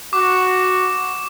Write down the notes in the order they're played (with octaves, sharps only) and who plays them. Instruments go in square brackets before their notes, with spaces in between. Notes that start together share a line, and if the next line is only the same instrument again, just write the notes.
[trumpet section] F#4 [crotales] D6